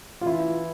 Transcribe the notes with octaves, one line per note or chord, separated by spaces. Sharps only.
F4
E3 E4